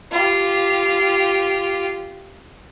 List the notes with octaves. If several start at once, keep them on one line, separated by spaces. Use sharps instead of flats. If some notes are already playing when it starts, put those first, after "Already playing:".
F4 G4